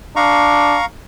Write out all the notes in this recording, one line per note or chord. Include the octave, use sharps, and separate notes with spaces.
D4 F5 A#5 C#6